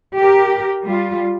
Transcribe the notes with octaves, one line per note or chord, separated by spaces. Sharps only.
G4 A#4
G3 F4